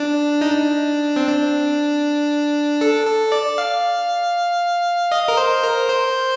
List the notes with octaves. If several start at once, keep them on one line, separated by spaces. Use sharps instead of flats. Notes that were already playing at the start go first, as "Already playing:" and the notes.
Already playing: D4
D#4
D4
C4
D4
A4
A4
D5
F5
D#5
A#4
C5
A#4
C5